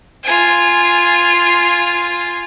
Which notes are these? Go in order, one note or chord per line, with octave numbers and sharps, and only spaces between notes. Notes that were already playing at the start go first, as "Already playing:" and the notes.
F4 G#5